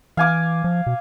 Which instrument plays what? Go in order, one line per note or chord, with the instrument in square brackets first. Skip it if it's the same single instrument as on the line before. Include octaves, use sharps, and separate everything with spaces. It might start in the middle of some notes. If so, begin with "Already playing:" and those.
[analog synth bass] E3 [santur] F5 G#5 D6
[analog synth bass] F3
B2